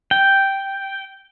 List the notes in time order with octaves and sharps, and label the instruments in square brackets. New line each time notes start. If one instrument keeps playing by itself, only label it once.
[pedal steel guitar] G5